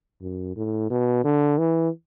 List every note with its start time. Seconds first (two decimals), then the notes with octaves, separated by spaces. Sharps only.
0.21 F#2
0.56 A2
0.90 B2
1.24 D3
1.58 E3